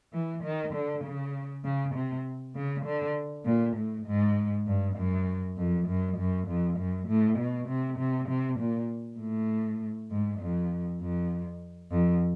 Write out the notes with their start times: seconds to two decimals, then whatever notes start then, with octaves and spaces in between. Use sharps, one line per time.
0.13 E3
0.43 D#3
0.74 D3
1.04 C#3
1.64 C#3
1.95 C3
2.55 C#3
2.85 D3
3.45 A#2
3.76 A2
4.07 G#2
4.67 G2
4.96 F#2
5.57 F2
5.88 F#2
6.18 F#2
6.48 F2
6.78 F#2
7.08 A2
7.38 B2
7.68 C3
7.99 C3
8.28 C3
8.59 A#2
9.20 A2
10.11 G#2
10.40 F2
11.01 F2
11.91 F2